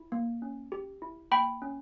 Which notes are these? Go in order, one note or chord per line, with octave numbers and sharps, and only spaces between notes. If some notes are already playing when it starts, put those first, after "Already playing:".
Already playing: E4
A#3
C#4
G4
E4
A#3 G5 B5
C#4